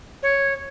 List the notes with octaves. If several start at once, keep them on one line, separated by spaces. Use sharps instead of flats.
C#5